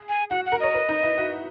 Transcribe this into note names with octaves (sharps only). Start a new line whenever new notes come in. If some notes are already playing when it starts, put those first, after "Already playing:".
Already playing: G#4
G#5
F#4 F#5
F#5
A#4
C#5 D#5
B4
D#4
E4
F#4